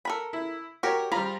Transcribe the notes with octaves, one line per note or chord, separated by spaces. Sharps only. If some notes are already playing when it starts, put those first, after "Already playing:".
A4 A#4 B5
E4
F#4 G4 A#4 C#5
F3 G3 F4 A#5 B5